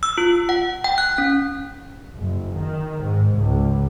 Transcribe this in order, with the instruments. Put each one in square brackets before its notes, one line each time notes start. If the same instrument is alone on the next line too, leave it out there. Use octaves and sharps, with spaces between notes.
[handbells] E6
F4
F#5
G5
F#6
C#4
[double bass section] F#1
D#3
G#2
C#2